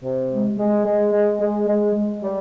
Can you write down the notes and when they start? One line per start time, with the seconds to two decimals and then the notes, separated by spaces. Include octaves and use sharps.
0.04 C3
0.31 G#3
0.59 G#3
0.85 G#3
1.13 G#3
1.40 G#3
1.68 G#3
1.95 G#3
2.22 G3